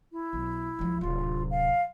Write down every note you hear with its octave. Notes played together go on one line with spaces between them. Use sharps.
E4
B1
C#2 F3
D1 C3 F4
F5